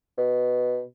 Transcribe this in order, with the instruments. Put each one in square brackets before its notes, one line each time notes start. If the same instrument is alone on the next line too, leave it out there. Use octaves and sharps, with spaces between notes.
[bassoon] B2